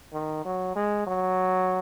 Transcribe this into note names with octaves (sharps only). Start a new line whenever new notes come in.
D#3
F#3
G#3
F#3